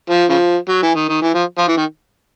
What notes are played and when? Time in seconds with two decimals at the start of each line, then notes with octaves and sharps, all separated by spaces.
0.10 F3
0.29 C#3 F3
0.69 F#3
0.83 E3
0.95 D#3
1.09 D#3
1.22 E3
1.34 F3
1.58 F3
1.68 E3
1.77 D#3